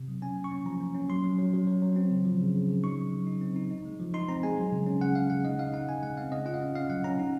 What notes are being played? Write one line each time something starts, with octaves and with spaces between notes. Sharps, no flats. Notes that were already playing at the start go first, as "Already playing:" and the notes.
Already playing: C3
F#3
C#4 G#5
A#3
C#6
C#4
F3 A#5
A#3
C#4
F#3 C6
F#3
F#3
F#3
F#3
F#3
C4
C#3
F3
C#3
C#3
C#3
D#4 C#6
F#3
F#3
D#4
C4
D#4
D#4
G#3
F3
D#4 C6
C4 A#5
G#3 G#5
F#3
C#3
C#4
C#3 F#5
C#3 F5
C#3 F#5
D#4 D#5
D#4 F5
D#4 F#5
D#4 G#5
G#3 F#5
C4 F5
C#3 D#5
F4 F#5
F5
C#4
C#4 F5
F#3 F#5
C#4 A#5
D#4